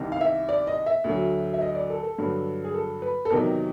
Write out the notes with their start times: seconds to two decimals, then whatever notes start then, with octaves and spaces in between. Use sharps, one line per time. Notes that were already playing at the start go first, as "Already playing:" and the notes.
Already playing: C2 C3 D#3
0.12 F5
0.21 E5
0.49 D5
0.67 D#5
0.86 E5
1.04 D2 D3 F#3
1.53 E5
1.61 D#5
1.75 D5
1.90 A4
2.03 A4
2.18 G2 D3 F#3
2.64 G#4
2.74 A4
3.02 B4
3.25 A4
3.30 E2 C3 D#3 F#3 A#4